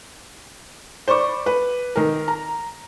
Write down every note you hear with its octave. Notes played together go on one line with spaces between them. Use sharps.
C5 D5 B5 C#6 D6
B4
D#3 A#4
A#5